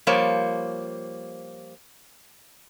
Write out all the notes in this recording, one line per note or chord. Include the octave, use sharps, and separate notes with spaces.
F3 G3 A#3 C5 C#5